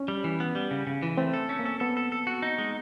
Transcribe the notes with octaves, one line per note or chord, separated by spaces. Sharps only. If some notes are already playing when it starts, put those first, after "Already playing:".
Already playing: C#4
G3
E3
B3
G3
C#3
C#3
E3
A3 C4
A4
C#4
A#3
A4
B3 A4
A4
A4
F#4
D#4
G#3